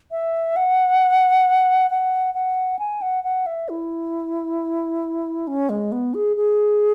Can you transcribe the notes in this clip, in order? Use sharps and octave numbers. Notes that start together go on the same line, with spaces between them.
E5
F#5
F#5
F#5
G#5
F#5
F#5
E5
E4
C#4
G#3
B3
G#4
G#4